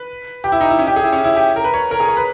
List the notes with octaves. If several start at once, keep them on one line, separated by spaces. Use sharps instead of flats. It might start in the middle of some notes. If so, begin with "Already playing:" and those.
Already playing: B4
G4
E4
D#4
E4
C#4
G4
G#4
E4
C#4
E4
G4
A#4
B4
C#5
A#4
G#4
C#5
B4